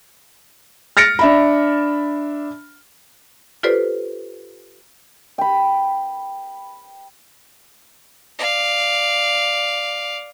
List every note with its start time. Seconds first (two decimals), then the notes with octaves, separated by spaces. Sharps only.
0.97 F6 A6 A#6 C#7 D7
1.19 D4 E5 B5
3.63 F4 G4 A4 B4 C5 D5
5.38 G5 B5
8.39 D5 F5